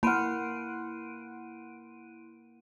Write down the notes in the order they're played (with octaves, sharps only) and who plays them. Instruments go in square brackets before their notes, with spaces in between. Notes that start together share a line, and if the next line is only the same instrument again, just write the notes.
[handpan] A#3 [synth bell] E4 D7 D#7 [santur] F#5 C6 [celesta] B5 F6